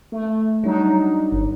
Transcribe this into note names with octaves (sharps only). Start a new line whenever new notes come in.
A3
F#3 G3 D4 D#4
G1